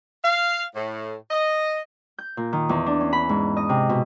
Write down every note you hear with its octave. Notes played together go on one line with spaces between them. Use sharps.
F5
A2
D#5
G6
A#2
D#3
E2
D4
C#4
B5
G#2
D#5
C3
B2